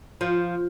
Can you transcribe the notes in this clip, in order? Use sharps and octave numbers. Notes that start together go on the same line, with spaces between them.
F3